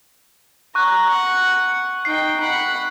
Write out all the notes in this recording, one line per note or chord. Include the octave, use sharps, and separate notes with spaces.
A#5 C#6 F#6
F#5
D#4 G5 C7
F#5 B5